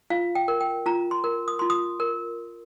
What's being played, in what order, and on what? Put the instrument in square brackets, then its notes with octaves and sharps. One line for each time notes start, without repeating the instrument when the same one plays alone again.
[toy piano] F4 F5
G5
A#4
G5
F4 A#5
C6
A#4
D#6
F4 C6
D#6
A#4